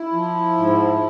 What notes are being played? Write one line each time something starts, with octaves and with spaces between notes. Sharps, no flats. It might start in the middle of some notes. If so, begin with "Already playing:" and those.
Already playing: E4
F3
G#2